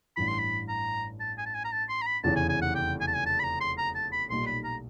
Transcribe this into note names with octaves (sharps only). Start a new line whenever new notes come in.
A1 G2 E3 B5
C6
B5
A#5
A5
G#5
A5
G#5
A#5
A5
C6
A#5
B5
F1 E2 C#3 E3 A5
G#5
G#5
F#5
G5
G#5
A5
G#5
A5
B5
A#5
C6
A#5
A5
B5
B1 A#2 G3 A#3 D#4 C6
B5
A#5